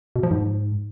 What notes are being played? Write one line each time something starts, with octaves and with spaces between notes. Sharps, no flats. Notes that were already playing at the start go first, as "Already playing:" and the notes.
B2
F3
G#2